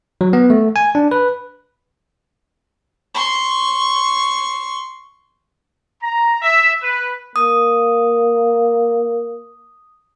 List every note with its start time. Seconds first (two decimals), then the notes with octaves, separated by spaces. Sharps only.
0.21 F#3
0.33 B3
0.50 A3
0.76 G#5
0.95 D4
1.11 B4
3.14 C6 C#6
6.02 A#5
6.42 E5
6.82 B4
7.36 A#3 D#6